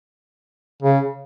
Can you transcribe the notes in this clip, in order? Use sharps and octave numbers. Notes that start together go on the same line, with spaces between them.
C#3